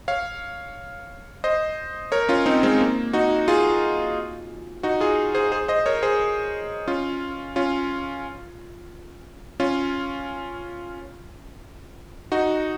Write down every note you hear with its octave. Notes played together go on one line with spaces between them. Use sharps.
C#5 F5
C5 D#5
A#4 C#5
C#4 F4
C4 D#4
G#3 C4
A#3
D#4 F#4
F4 G#4
D#4 F#4
F4 G#4
G#4 C5
G#4 C5
C5 D#5
A#4 C#5
G#4 C5
C#4 F4
C#4 F4
C#4 F4
D#4 F#4